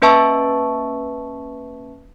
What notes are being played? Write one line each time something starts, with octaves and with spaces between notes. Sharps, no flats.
A#3 C#4 B4 E5 A5 C#6